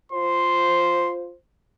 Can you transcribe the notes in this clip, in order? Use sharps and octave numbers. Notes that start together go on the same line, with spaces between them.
F4 C5 C6